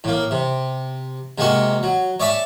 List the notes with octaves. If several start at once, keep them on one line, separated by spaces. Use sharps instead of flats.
A2 A#3
C3
C3 G#3 A#3 F#4 C#6
F#3
C#5 D5 E5 G#5 A5